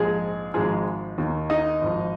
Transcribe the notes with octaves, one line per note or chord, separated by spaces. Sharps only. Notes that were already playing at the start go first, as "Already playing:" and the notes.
Already playing: A#1 G#2 F3 G#3 G#4
G#1 G#2 F3 G#3 G#4
D#2 D#3
D#4 D#5
G#1 G#2 F3